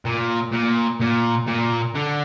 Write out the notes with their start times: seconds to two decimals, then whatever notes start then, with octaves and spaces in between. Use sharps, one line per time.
0.05 A#2
0.53 A#2
1.00 A#2
1.47 A#2
1.95 D3